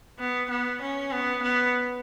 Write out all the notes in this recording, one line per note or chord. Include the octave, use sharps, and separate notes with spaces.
B3
B3
C#4
B3
B3